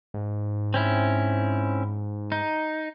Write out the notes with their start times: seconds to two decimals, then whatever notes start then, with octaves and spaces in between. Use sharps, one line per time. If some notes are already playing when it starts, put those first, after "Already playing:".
0.14 G#2
0.74 C4 C#4 E4
2.32 D#4